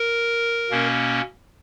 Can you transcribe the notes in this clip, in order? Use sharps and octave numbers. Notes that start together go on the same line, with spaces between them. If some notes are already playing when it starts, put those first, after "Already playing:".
Already playing: A#4
B2 A#3 C#4